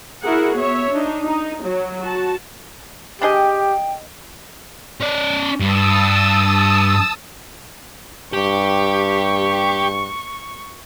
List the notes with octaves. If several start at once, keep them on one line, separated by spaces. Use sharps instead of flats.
E4 F#4 G#4 A#4 F#5
B3 C#5 E5
D4 D#4
D#4
F#3
F#4 A5
D4 G4 G#4 D#5 G5
C#4 D5
G2 A5 D#6 E6
G2 G4 C#6